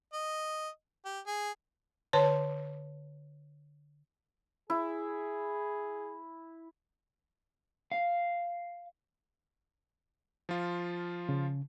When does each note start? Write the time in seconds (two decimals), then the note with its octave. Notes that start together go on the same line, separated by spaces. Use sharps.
0.13 D#5
1.05 G4
1.27 G#4
2.13 D3 B4 C#5 A5
4.70 E4 G#4
7.92 F5
10.49 F3 F4
11.29 C#3